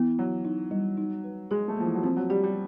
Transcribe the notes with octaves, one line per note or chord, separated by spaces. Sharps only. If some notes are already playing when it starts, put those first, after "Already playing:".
Already playing: E3 B3
F#3 F#4
D#4
G3
D#4
B4
G#3 G#4
A3
F3 A#3
E3
F#3
F3 C4
F#3
G3 G4
G3